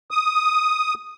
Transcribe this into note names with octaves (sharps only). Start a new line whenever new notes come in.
D#6